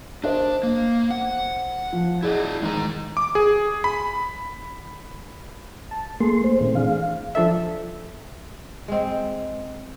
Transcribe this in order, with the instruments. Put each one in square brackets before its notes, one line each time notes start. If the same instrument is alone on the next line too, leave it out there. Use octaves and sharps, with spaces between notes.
[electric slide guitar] D4 [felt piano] A#4 C5 D#5
[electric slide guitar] A#3
F#5
[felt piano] F3
[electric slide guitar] E4 D5 D#5 [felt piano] G#4
[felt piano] D#3 [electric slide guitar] G#3 D#5 A#5
[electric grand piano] D6
G#4
B5
[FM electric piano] A5
[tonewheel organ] A3 C6 [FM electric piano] A#3 G#4
[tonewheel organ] C5
[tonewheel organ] A#2 D#3 [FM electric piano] A3 C4
[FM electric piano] E3 D4 G#4 [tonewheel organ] F5
[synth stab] F3 D4 A4 E5
[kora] G#3 C4